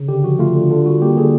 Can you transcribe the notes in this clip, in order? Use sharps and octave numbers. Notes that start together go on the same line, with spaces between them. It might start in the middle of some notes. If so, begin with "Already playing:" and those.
Already playing: C#3
D3 G4
F3 F#4
A3 F4
D3
D3 F4
G3 F#4
A#3 G4
D3 G#4